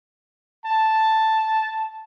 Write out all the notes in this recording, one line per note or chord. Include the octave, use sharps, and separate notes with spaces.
A5